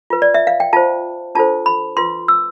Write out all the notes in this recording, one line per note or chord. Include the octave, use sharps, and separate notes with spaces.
F4 B4
D5
E5
F5
G5
F4 C5 A5
D4 F4 A4 C5 A5
B5
F4 B4 C6
E6